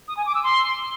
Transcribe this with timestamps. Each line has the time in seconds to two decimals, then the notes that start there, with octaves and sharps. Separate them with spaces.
0.08 D#6
0.17 G#5
0.26 D6
0.35 E6
0.44 C6